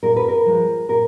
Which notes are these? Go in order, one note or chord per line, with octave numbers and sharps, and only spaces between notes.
A#2 A#4
B4
A#4
F3 G#3
A#2 A#4